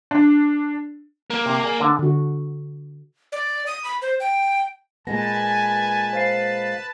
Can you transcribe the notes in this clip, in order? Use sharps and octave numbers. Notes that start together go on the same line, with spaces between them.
D4
A#3
C3
G#4 D5
D3 D4
D3 F#4
D5
D#6
B5
C5
G5
A#2 G#3 B3 B4 G#5 A5 A#6
C5 F5 C7